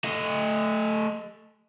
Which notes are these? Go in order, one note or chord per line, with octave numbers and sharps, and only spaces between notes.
A3 D#5